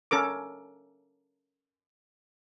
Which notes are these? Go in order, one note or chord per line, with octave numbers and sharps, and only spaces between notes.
C#4 A4 A#4 D6